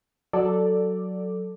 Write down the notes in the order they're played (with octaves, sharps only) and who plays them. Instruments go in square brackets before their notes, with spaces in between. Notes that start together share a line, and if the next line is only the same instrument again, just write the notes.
[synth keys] F#3 A4 D5